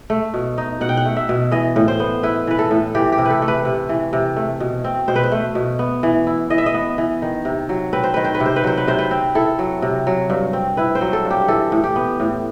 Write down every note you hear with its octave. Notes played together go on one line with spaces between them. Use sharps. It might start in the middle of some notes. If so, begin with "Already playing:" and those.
A3
B2
D#4
B2 F#5
G5
F#5
A3
E5
B2
E3 D#5
A2
C5
B3
E4 B4
E3 B4
A4
A2
E3 G4
G4
C3
A4 B4
A3
B4
C3
E3
C3
A3
B2
C4
B2 C5
B4
C5
A3
B2
B3
E3
E4
E3 D#5
E5
D#5
B3
E3
D#3
C3
F#3
C4 B4
C5
D#3 B4
C5
B4
C3
C5
B4
F#3 C5
B4
C3 C5
B4
C4
E4 A4
F#3
C3
F#3
G2
C4
E4 B4
C5
F#3
A4
G2
G4
E3 A4
A2
G4
B3
A2